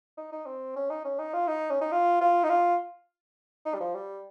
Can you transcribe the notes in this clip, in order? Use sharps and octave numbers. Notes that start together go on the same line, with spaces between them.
D#4
D#4
C4
C#4
D#4
C#4
D#4
F4
D#4
C#4
D#4
F4
F4
D#4
F4
D#4
G3
F3
G3